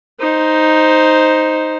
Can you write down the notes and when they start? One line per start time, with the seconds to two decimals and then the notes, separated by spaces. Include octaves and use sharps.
0.20 D#4 C5